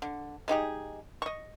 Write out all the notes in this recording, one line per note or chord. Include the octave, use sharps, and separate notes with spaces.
D3
G#3 D#4 G4 G#4
D#5 C#6